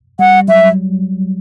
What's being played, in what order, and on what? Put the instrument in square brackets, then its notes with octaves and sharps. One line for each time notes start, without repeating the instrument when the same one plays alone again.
[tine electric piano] G3 [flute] F#5
[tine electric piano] F#3 [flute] E5